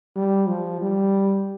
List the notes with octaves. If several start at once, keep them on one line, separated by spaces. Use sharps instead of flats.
G3
F3
G3